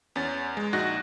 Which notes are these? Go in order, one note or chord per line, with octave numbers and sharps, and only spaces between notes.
E2 C#4 A6
G#3
A#1 D#4 F#4 F#6 A#6